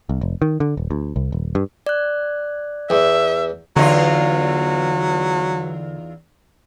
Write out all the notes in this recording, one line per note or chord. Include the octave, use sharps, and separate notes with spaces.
C2
F1
D#3
D3
D#1
D2
C2
D#1
G2
D5 F#6
E2 E5
E2 D3 F#3 D#4 F4